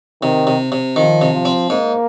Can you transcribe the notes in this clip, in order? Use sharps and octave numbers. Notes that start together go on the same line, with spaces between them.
C3 D#3
C3
C3
D#3 F3
C3
F3
C4
G#2 A#3